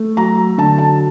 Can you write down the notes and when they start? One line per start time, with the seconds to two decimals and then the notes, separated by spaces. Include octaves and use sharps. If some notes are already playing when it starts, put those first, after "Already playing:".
Already playing: A3
0.17 F#3 A#5
0.58 D3 A5
0.78 A5